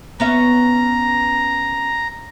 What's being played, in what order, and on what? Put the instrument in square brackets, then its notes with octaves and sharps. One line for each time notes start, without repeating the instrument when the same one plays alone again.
[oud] B3 C#4 E5 [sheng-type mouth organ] A#5